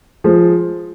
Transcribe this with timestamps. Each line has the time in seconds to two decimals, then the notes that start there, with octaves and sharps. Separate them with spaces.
0.24 F3 G#3